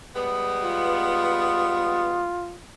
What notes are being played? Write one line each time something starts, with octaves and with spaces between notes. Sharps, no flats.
G3 G#3 B3
F4